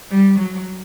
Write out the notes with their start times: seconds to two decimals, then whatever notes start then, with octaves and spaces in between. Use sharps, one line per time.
0.11 G3
0.39 F#3